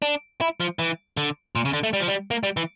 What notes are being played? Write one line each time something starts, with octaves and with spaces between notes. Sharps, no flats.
D4
E4
F3
E3
D3
A#2
C#3
D3
A3
G3
F3
G3
A#3
G3
E3